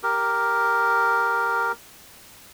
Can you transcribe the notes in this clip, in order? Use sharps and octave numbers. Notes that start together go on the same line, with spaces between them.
G4 A#4